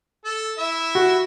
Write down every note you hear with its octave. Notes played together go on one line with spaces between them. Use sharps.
A4
E4 E5
F#4